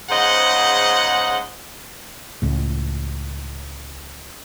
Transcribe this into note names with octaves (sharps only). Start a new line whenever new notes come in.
G#2 C#3 C5 D#5 F#5
C#2 A2